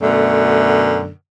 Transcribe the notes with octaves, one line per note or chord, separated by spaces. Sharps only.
F#2 B2 D3 A3